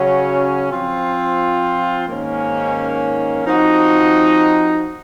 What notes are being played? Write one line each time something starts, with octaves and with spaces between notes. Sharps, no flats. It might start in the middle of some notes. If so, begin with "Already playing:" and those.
Already playing: C#3 F#3 C#4 F#4
F3 C4 F4
G#2 D#3 A#3 C#4
F3 C4 D#4 F#4